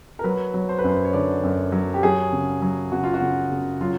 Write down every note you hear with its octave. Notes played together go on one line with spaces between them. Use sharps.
A#4
F#3 B4
F#3
C5
B4
F#2 C5
C#5
D3 D5
F#2
F#3
G4
F#3 G#4
C#3
F#3
C#3 F#4
F4
F#4
C#3
C#3
F#3 F4